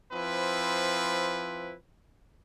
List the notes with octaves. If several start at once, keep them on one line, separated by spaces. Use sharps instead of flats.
F3 C4 E4 B4